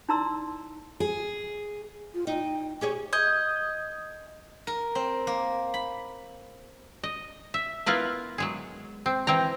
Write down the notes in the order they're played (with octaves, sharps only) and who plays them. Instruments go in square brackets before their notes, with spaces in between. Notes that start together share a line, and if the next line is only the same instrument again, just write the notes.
[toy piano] D#4 E4 D5 A#5 C6 E6
[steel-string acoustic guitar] G#4
[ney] F4
[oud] D#4 [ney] G5
[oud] G4 G#4 C#5 [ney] G#5
[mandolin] D#5 [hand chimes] D#6 G6 G#6
[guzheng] A#4
C4
A#3
B5
[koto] D#5
E5
B3 E4 F4 A#4 B4
F#3 G#3 G#4
C4
E3 C4 G5 A#5